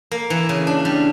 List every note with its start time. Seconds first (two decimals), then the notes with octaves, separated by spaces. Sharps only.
0.11 A#3
0.30 E3
0.49 C#3
0.67 D4
0.85 G3